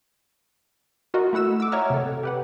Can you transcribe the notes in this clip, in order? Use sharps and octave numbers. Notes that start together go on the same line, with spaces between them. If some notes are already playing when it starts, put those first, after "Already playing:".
F4 F#4 A#4 D#5
A3 E4 F#5 E6 E7
D6 E6
C#5 D#5 E5 F#5 A#5 F6
C3 A4
G4 B4 F#5